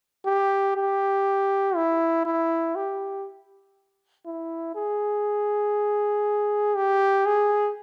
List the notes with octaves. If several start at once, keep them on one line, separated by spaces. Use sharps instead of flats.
G4
G4
E4
E4
G4
E4
G#4
G4
G#4